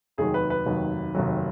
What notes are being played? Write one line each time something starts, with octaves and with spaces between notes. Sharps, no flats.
F1 D#2 D#3 F#3 G#4
B4
B4
F1 D#2 D#3 F#3
F1 D#2 D#3 F#3